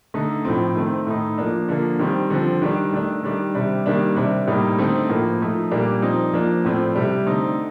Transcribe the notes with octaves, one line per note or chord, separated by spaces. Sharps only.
D3 A3 D#4
A2 F3 C4
D#3 A3 C4
A2 A3 D#4
F3 A#3 D4
D3 F3 A#3
D#3 G3 C4
D3 F3 C4
D#3 G3 D4
D#3 A3 D4
D#3 G3 D4
C3 G3 D4
D#3 G3 A#3 D4
C3 G3 D4
A2 G3 A#3 D#4
D3 A3 C4 D#4
A2 F3 A#3
F3 A3 D#4
A#2 G3 A#3 D4
F3 C4 D#4
F3 A#3 D4
A2 F3 A3 C4
C3 G3 D4
D3 A3 C4 D#4